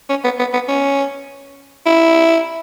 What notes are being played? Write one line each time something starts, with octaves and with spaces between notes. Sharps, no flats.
C#4
B3
B3
B3
C#4
E4